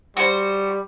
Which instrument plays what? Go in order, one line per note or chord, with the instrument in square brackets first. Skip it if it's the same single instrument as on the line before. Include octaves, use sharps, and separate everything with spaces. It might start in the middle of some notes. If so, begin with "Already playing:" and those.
[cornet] G3 [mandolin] F#4 C5